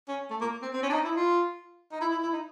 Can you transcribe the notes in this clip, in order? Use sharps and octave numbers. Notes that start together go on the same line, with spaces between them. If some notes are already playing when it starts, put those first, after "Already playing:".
C#4
A3
A#3
C4
C4
C#4
D4
D#4
E4
F4
D#4
E4
E4
E4
D#4